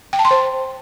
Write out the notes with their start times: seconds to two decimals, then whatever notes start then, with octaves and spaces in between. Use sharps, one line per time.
0.13 G5
0.19 A5
0.25 C6
0.31 C5